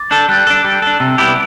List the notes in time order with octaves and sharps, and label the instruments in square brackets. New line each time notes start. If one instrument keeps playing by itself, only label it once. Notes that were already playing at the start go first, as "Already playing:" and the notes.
Already playing: [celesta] D6 A6
[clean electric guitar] D4 A4 [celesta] G6
[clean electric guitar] G3 [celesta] F#6
[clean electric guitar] D4 A4
G3
D4 A4
[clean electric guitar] C3 [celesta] E6
[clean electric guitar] G3 B3 E4 G4